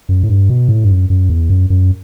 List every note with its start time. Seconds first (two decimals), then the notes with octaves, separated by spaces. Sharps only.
0.09 F#2
0.23 A2
0.29 G2
0.50 B2
0.69 A2
0.84 G2
0.90 F#2
1.10 F#2
1.29 E2
1.50 F#2
1.70 F#2